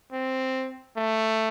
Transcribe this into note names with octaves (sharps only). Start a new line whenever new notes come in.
C4
A3